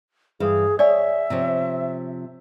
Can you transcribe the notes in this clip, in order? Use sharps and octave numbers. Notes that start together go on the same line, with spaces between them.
G2 E3 G#4 F5
C#5 D5 E5 G#5
C3 F3 C#5